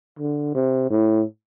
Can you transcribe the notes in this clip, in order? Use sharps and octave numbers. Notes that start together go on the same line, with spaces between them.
D3
C3
A2